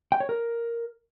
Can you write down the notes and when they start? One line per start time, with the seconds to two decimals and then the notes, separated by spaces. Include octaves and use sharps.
0.12 G5
0.20 C#5
0.29 A#4